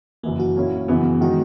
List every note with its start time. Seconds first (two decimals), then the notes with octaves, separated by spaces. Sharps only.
0.23 F#1 F#2 E3 A#3
0.40 F#4
0.56 A#2 A#3 C#4 E4
0.88 F#2 C#3 E3 B3
1.21 D#3 G#3 D#4 F#4